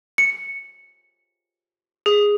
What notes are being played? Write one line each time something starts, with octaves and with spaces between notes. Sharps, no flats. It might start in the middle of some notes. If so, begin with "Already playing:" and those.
C#7
G#4